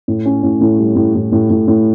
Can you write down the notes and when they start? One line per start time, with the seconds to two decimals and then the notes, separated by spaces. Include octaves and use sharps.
0.08 A2
0.26 C#4
0.43 A2
0.61 A2
0.79 G3
0.96 A2
1.15 A2
1.32 A2
1.50 A2
1.68 A2